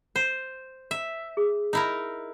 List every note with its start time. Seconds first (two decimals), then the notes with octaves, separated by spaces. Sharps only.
0.16 C5
0.91 E5
1.37 G#4
1.73 D#4 E4 A#4